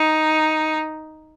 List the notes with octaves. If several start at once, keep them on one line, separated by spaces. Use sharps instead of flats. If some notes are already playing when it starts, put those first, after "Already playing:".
Already playing: D#4